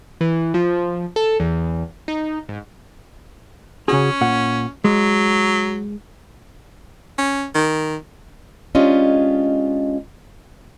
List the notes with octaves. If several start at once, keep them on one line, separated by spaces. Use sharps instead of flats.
E3
F3
A4
E2
D#4
G#2
C#3 C#4 F#4 G#4
A#2 F#5
F#3 G#3
C#4
D#3
G#3 C#4 D4 F4 G4 D#5